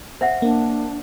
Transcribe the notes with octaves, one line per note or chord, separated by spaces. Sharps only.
C5 E5 F#5
A#3 D4